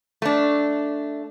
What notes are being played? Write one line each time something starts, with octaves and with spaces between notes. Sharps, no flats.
A3 D4